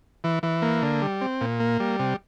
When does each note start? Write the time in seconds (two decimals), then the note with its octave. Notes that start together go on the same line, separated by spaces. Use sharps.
0.24 E3
0.43 E3
0.62 A#3
0.83 D3
1.02 G3
1.21 C4
1.41 A#2
1.60 A#3
1.80 G3
1.99 C3